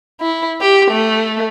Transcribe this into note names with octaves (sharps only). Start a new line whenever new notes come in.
E4
G4
A3